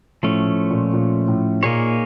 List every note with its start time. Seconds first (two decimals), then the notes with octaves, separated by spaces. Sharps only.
0.23 A2 F3 A3 C#4
0.46 A2
0.70 A#2
0.93 A#2
1.28 A2
1.63 A#2 A#3 D#4 G#4 C#5